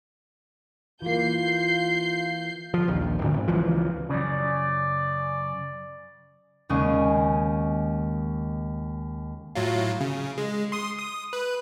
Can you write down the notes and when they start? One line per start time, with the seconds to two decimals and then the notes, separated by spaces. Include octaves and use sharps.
1.02 E3 A#3 F4 G6 C7
2.74 F3
2.88 A#1 D#2
3.19 G#1 D2
3.34 G#1
3.48 C#2 E3 F3
4.09 F#2 C#3 D5
6.69 D#2 C#3 G#3 C#4 G#4
9.55 A2 F#3 F4
10.01 C#3
10.38 G#3
10.72 C6 D#6
10.98 D#6
11.33 B4